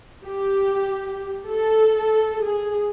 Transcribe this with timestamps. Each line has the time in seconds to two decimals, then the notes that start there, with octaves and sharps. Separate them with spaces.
0.25 G4
1.47 A4
2.43 G#4